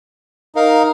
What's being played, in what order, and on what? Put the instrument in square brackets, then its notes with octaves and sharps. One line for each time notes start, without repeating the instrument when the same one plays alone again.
[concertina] D#4 A#4 F5